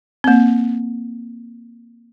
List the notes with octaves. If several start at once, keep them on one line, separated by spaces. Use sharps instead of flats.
A#3 C4